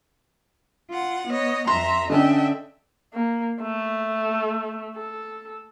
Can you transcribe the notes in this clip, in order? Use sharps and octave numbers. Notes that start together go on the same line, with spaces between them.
F4 F#5
B3 C#5 D#5
F2 E5 A#5 C6
D3 C#4 D4 D#5 E5 G5
A#3
A3
A4